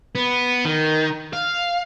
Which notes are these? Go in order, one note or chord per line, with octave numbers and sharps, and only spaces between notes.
B3
D#3
F5